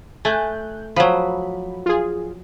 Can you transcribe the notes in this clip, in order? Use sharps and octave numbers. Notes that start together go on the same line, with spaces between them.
A3 G#5 F#6 G6
F3 F#3 B5
F4 G#4